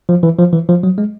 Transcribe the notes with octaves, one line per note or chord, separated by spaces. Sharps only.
F3
E3
F3
E3
F3
F#3
G#3